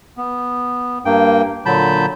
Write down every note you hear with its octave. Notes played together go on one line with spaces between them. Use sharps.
B3
G2 A#3 G5
A#2 D3 F#3 A5 B5 G6